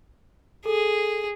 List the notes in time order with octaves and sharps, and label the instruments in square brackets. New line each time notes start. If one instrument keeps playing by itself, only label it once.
[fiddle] G#4 [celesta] A4